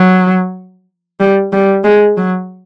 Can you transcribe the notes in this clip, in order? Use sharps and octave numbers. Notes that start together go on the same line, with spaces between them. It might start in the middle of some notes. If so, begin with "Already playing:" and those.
Already playing: F#3
G3
G3
G#3
F#3